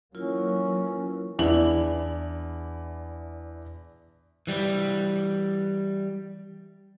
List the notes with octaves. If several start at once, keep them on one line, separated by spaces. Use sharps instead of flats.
E3 F#3 A#3 C#4 E4 F4 A#4
E2 D4 E4 D5 F#7
E3 G3